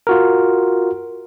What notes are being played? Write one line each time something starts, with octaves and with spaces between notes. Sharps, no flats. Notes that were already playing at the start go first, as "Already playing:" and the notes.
F4 F#4 A#4